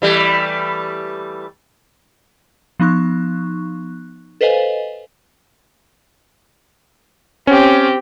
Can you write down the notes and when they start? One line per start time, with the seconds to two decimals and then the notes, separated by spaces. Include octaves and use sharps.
0.02 E3 G3 A3
2.80 F3 B3 D#4 C#6 F#6
4.41 A4 B4 C5 D#5 F5 G#5
7.47 C4 C#4 G4